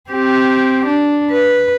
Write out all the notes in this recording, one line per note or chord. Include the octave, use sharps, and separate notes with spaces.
C4 G4
D4
B4